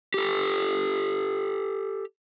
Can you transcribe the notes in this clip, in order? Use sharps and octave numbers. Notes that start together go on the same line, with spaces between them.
G4 A4